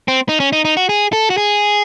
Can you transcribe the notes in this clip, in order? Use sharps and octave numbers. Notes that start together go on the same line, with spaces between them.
C4
D#4
C#4
D#4
D#4
F#4
G#4
A4
F#4
G#4